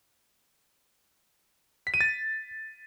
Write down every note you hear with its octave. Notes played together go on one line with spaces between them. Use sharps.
B6
D#7
A6